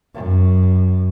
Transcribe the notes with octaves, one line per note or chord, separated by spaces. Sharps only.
F#2